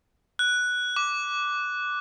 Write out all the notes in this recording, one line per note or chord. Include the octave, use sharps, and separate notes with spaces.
F#6
D6